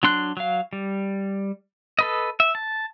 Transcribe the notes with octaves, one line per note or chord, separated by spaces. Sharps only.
F#3 D4 C6 F#6
F#3 F5
G3
A4 B4 D#5
E5
A5